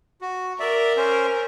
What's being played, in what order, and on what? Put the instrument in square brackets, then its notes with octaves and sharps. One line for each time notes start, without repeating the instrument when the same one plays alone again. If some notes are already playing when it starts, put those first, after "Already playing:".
[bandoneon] F#4
[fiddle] A#4 [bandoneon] D5 E5
[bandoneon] C#4 C5